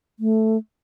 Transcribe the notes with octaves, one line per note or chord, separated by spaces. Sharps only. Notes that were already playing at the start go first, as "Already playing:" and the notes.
A3